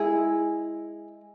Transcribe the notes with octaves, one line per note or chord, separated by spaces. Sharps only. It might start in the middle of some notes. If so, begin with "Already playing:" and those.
Already playing: G#3 E4 G#4